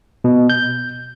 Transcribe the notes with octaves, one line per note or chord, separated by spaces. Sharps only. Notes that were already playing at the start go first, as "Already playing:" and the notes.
B2
G6